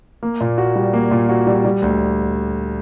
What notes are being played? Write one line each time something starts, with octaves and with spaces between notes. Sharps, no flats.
A#3
A#2
F#4
G3
A#3
A#2
F#4
G3
G3
D2